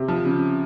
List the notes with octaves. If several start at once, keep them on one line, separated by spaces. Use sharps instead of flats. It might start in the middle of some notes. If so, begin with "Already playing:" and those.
Already playing: C3
F3
C#3